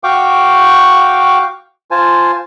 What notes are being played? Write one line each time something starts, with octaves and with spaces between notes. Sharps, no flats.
F#4 F5 G5 C#6 D6
F4 C5 G#5 A5